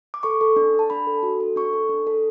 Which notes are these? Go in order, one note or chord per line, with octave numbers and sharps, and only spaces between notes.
D6
A4 C#6
A4
D4
D4
A5
D4 B5
A4
F#4
A4
D4 C#6
A4
D4
A4